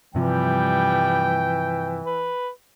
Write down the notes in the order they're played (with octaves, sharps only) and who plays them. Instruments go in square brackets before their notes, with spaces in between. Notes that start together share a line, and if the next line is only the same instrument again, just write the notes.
[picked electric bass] G2 C3 F3 [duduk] E3 [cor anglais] G3 [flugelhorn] G5
[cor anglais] B4